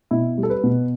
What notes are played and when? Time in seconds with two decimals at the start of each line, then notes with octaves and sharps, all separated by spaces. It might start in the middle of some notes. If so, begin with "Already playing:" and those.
0.11 B2 E4
0.38 G3
0.43 A4
0.50 B4
0.64 B2